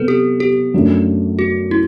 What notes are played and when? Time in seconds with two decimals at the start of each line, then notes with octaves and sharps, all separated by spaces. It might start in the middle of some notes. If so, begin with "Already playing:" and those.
Already playing: C3 F#3 B3 A4 B4
0.08 G4
0.40 G4
0.74 F#2 F#3 A3 D4
1.39 F#4
1.71 E4